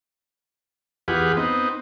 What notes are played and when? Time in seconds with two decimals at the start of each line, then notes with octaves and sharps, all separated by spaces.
1.08 E2 F4 G4 G#4 B4 F#5
1.37 B3 C4 D#4